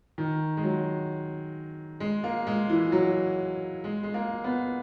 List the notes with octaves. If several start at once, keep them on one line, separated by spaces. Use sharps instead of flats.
D#3
G#3
F#3
G#3
A#3
G#3
E3
F#3
G#3
G#3
A#3
B3